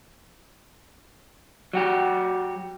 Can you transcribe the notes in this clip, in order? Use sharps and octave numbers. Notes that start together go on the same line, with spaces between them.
F#3 F#4 G4